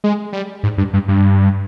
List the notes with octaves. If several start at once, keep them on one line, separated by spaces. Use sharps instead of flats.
G#3
G3
G#2
G2
G2
G2